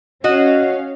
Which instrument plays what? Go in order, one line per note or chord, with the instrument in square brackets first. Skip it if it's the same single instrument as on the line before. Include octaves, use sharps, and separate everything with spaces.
[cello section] C#4 F5 [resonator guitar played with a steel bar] F#4 D#5